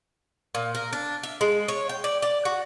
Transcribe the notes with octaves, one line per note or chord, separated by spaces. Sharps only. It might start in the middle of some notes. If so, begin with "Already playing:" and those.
A#2
A#4
D4
E5
G#3
C#5
G5
D5
D5
F#4